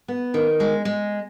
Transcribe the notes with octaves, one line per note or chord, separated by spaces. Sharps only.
B3
D#3
G#3
G#3